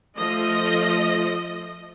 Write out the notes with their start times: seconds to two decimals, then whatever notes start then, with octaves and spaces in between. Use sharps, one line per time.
0.16 F3 A3 D#5